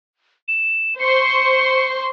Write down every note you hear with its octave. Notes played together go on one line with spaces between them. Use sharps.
E7
C5 C6 C#6 C#7